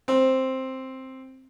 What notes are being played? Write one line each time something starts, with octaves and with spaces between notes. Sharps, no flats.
C4